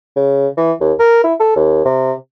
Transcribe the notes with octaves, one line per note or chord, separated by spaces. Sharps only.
C#3
E3
D#2
A#4
E4
A4
D#2
C3